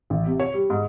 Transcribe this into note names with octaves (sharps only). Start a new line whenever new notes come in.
A1
C3
C#5
G3
G#2